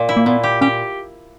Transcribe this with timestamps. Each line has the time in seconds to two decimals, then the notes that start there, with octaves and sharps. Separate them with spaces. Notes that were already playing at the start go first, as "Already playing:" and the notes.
Already playing: A#2
0.09 E4
0.17 A#3
0.26 A#2 B3
0.44 G4
0.61 C#4 G4